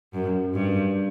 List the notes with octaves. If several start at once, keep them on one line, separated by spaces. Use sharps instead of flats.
F#2
G2